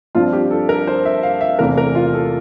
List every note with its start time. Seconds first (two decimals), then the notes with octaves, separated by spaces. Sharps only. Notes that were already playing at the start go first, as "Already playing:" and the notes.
0.15 G2 F3 C4 F4
0.33 G4
0.51 A4
0.69 A#4
0.87 C5
1.05 E5
1.23 F5
1.41 E5
1.59 E2 C3 E3 A3 C4 A#4
1.77 A#4
1.95 F4
2.13 A4